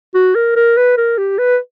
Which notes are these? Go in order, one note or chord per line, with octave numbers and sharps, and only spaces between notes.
F#4
A#4
A#4
B4
A#4
G4
B4